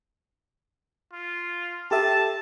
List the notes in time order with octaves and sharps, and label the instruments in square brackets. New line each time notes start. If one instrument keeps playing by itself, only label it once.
[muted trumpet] F4
[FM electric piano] G4 A4 E5 [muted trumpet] A5